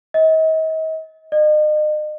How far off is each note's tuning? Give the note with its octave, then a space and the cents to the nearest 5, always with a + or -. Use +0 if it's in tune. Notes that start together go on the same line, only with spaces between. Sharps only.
D#5 +40
D#5 -40